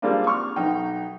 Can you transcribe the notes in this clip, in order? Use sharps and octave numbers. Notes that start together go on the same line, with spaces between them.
G3 G#3 A#3 C4 D4 F4
C#6 D6 F6
B1 D#4 G5